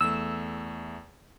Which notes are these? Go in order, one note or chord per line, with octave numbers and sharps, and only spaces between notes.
E2 A3 E6